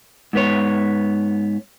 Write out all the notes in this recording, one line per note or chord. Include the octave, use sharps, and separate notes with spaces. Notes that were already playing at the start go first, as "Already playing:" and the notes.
G#2 B3 C#5